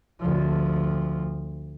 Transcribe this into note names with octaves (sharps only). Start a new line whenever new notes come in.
D2 F3